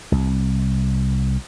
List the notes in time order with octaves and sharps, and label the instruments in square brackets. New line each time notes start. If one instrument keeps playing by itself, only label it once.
[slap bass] C2